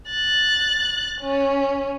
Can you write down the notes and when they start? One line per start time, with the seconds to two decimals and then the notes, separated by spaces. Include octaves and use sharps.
0.10 F#6 A6
1.21 C#4